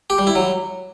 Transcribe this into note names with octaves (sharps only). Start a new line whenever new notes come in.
G4
G3
E4
F#3